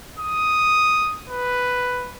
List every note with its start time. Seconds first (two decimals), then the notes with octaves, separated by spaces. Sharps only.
0.19 D#6
1.30 B4